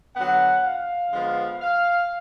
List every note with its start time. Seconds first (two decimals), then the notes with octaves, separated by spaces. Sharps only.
0.16 D3 F#3 B3 F#5
0.64 F5
1.12 D3 F3 G#3 B3
1.60 F5